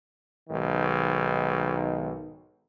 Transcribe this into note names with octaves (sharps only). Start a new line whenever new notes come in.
B1 G#2 D#3